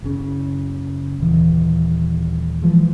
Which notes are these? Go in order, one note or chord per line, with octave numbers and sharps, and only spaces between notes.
F#1 C#3
D#1 E3
E3 F3 G#3